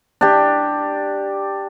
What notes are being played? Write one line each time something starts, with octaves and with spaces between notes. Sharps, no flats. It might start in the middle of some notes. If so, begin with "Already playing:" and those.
D4 G4